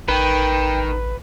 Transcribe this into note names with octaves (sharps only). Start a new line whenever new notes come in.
A1 D#3 B4 G5